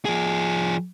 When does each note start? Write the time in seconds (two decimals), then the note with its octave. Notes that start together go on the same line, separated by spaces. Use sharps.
0.05 F3 G#4